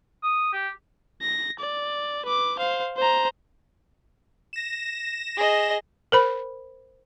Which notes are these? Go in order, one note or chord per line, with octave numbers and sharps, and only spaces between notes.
D#6
G4
A#6
D5
B4 D6
C5 F5
C5 A#5
A#6 E7
G#4 D#5
A#4 C5 B5